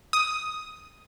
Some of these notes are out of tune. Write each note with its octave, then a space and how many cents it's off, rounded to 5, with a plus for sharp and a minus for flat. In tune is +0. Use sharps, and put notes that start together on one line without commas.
D#6 +5